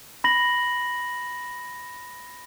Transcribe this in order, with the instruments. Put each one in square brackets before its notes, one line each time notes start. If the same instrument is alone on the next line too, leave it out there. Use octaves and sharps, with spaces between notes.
[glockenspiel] B5 A#6 F#7